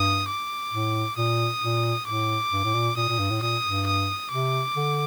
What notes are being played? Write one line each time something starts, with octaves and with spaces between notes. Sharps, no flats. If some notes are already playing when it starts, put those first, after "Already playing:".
Already playing: G2 D#6
D6
A2
A#2 D#6
A#2
A2 D6
G2
A2
A#2
A#2 D#6
A#2
G2
A2
A#2 D#6
G2
D#6
C3 D6
D3